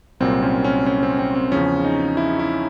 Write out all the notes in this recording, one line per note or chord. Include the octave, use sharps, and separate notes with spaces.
C2 A#2 F#3 C4
C#4
C#4
C#4
C4
C4
C4
E2 C#3 F3 C#4
D#4
E4
E4